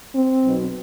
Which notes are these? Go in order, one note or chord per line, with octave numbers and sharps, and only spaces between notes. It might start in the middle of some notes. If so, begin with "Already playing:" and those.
C4
B1 B2